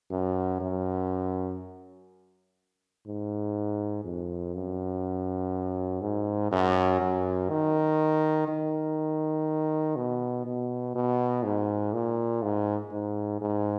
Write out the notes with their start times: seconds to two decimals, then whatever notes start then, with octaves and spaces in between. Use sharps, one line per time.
0.11 F#2
0.60 F#2
3.07 G#2
4.04 F2
4.55 F#2
6.01 G#2
6.51 F#2
7.00 F#2
7.50 D#3
8.48 D#3
9.96 B2
10.45 B2
10.95 B2
11.43 G#2
11.93 A#2
12.42 G#2
12.91 G#2
13.41 G#2